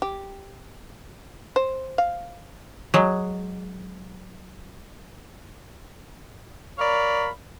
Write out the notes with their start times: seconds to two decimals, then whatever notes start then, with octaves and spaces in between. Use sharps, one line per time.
0.02 G4
1.56 C5
1.98 F5
2.94 F#3 G#3
6.79 A#4 C#5 D5 F5 A#5 B5